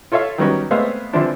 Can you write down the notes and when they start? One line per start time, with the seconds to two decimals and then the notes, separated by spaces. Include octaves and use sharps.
0.12 F4 A4 C#5 E5 F5
0.38 D#3 F#3 G3 B3 C#4 F#4
0.71 G#3 A3 B3 C4 E5 F5
1.13 D3 E3 F3 C4 D4 E4